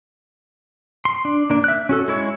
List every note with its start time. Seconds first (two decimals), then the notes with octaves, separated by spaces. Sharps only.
1.05 C6
1.25 D4
1.50 A#3 D4
1.64 E5 F#6
1.89 C#4 F#4 A4
2.08 G#3 E4 C#5